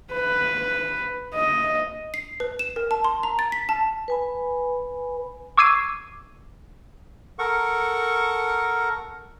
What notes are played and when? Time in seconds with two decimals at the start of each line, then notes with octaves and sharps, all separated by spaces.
0.13 B4
1.34 D#5
2.14 C7
2.40 B4
2.59 E7
2.76 A#4
2.91 A5
3.04 C6
3.23 A#5
3.39 A6
3.52 B6
3.69 A5
4.08 B4 G#5 B5
5.58 C#6 D6 E6 G#6 C7 D#7
7.39 A4 A#4 F#5 C#6